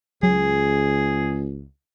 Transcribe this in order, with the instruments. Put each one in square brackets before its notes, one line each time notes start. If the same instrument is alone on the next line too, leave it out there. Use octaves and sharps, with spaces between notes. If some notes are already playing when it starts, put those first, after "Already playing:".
[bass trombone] C#2 [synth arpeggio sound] F#3 [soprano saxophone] G#4